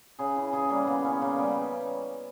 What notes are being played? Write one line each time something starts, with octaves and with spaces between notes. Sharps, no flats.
C#3 G#4
E3
C#3 G#4
G3 A#3
C#3 B3
E3 C#4
C#3 A#3
G3 B3